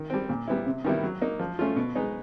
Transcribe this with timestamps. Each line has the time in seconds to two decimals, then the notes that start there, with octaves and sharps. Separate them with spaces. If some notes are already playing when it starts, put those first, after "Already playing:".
Already playing: D#3
0.10 G3 C4
0.29 A#2
0.48 G3 B3 E4
0.66 C3
0.84 D#3 G3 B3 E4
1.03 F#3
1.21 A#3 D#4
1.39 F3
1.59 A3 C#4 F4
1.76 B2
1.95 G#3 B3 D#4